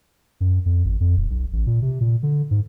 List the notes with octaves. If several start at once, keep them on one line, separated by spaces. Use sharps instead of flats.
F#2
F2
G#1
F2
D#1
B1
A1
A#2
C3
A#2
D3
G#2